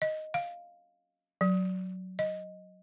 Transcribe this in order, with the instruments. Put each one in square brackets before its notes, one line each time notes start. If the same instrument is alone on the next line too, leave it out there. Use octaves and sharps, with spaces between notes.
[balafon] D#5
F5
F#3
D#5